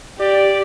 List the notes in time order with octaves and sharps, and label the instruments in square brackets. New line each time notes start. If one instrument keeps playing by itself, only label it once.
[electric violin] G4 [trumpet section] D5